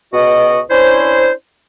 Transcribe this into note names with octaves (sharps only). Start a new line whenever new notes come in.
C#2 B2 F#4 D#5
C#4 D4 E4 C5